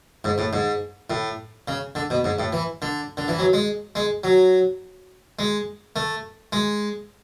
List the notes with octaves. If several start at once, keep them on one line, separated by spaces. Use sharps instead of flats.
G#2
A2
G#2
A2
C#3
D3
B2
G#2
A2
E3
D3
D3
E3
F#3
G#3
G#3
F#3
G#3
A3
G#3